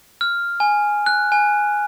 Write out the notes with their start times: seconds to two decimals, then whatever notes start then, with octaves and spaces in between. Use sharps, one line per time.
0.21 F6
0.60 G#5
1.06 F#6
1.32 G#5